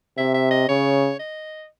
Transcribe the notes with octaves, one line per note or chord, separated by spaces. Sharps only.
C3 E5
E5
D#5
C#3 C#5
D#5